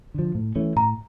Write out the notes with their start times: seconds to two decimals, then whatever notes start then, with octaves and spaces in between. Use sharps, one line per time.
0.14 D3 F3
0.35 A2
0.56 E3 A3 C#4
0.76 A2 A#5